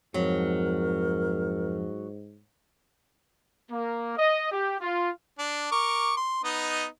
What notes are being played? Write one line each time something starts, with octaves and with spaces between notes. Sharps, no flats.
F2 G#2 F#3 A#4
A#3
D#5
G4
F4
D4
A#4 C#6 D6
C6
B3 D#4 D#5